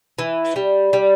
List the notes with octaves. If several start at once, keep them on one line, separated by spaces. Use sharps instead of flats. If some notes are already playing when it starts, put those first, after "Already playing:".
E3
G3
G3